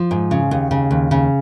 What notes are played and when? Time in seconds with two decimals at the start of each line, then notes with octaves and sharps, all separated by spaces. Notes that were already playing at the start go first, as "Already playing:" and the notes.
Already playing: F3
0.11 G#2
0.31 C#3
0.51 D#2
0.71 C#3
0.91 D#2
1.11 C#3